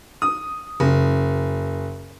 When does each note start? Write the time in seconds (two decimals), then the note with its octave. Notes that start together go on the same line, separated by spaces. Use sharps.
0.22 D#6
0.80 F#1